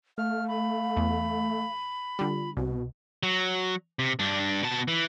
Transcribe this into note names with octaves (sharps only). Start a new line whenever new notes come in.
A3 F5 F6
B5
E2
D3 G3 F4
C2 B2 F#4
F#3
C3
G2 D4
B2 A5
E3